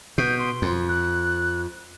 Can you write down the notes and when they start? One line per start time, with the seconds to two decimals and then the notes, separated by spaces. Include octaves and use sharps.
0.18 B2 G6
0.39 C6
0.62 F2
0.89 F#6